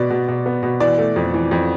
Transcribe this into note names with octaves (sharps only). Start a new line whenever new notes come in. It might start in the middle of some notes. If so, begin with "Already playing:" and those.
Already playing: B2 B3 D5
B2
B2
B3
B2
E3 D5
A3
F2
E3
F2